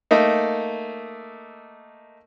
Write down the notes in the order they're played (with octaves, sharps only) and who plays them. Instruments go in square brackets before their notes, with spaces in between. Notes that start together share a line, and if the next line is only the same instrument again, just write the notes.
[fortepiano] A3 A#3 D#4